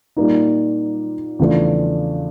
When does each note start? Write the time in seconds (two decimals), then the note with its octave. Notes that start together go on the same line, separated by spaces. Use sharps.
0.16 A#2 G3 A#3 D#4
1.39 E2 C#3 F3 A3 D4